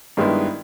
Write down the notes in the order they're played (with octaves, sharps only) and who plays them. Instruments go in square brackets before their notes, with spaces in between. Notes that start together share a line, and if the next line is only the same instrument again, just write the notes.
[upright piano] G2 D#3 G#3 B3 E4